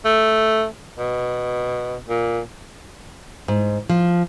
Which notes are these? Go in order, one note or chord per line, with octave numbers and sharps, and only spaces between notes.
A3
B2
A#2
G#2
F3